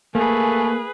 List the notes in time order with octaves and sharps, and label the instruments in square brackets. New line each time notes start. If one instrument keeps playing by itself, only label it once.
[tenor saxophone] A3 [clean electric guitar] A#3 [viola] G#4 B4 [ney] G#5